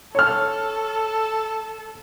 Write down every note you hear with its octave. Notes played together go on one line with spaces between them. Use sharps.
A4 C#5 F6